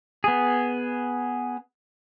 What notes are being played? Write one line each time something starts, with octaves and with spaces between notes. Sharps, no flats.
B3 G#4